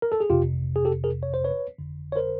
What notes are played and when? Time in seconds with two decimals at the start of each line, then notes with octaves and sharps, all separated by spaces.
0.02 A#4
0.12 A4
0.20 G#4
0.30 G1 F2 C3 F4 G4
0.76 G#4
0.85 G4 A4
1.04 G#4 A#4
1.23 C#5
1.34 C5
1.44 B4 C#5
1.78 G1 F2 D3
2.12 C#5
2.16 A#4 C5